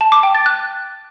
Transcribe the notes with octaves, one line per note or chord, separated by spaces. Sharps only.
A5
D6
G5
A6
F#6